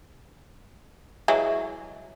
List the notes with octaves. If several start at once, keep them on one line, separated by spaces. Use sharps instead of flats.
E3 F#3 G#3